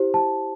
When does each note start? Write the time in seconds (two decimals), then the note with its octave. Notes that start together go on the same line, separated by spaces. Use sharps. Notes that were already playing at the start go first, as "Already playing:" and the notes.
Already playing: E4 G4 C5
0.14 A5